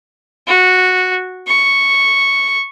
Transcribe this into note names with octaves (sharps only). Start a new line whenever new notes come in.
F#4
C#6